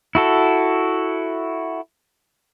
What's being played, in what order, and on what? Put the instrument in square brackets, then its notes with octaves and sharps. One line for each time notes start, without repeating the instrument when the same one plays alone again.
[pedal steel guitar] E4 F#4 A4